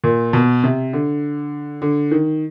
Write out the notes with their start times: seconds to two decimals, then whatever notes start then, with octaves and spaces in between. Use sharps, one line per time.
0.04 A#2
0.33 B2
0.64 C3
0.93 D3
1.82 D3
2.11 D#3